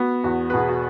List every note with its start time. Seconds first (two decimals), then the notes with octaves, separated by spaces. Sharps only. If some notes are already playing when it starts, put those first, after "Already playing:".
Already playing: B3 F#4
0.24 E2 F#4
0.50 B4
0.54 B2 G#4
0.68 F#4